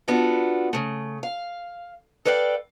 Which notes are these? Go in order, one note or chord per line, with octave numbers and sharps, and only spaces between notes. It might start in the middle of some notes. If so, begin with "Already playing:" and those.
B3 D4 F4 F#4 A4
C#3 A3
F5
A4 B4 D5 F5 G5